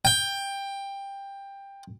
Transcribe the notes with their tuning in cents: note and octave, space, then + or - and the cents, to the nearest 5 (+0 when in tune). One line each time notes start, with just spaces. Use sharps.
G5 +15